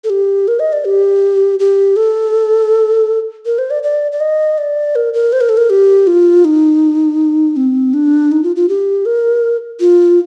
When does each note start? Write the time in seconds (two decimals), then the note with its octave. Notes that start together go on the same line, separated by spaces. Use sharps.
0.04 A4
0.10 G4
0.48 A#4
0.60 D#5
0.73 D5
0.85 G4
1.59 G4
1.96 A4
3.46 A#4
3.58 C5
3.70 D5
3.83 D5
4.12 D5
4.20 D#5
4.58 D5
4.96 A#4
5.14 A#4
5.33 C5
5.41 A#4
5.49 A4
5.57 A#4
5.70 G4
6.07 F4
6.45 D#4
7.57 C4
7.94 D4
8.32 D#4
8.43 F4
8.56 F4
8.69 G4
9.06 A#4
9.80 F4